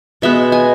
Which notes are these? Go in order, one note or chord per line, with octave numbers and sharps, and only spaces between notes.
B2 G#3 B3 E5
G#5